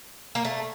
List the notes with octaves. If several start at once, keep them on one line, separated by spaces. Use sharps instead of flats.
A#3
A3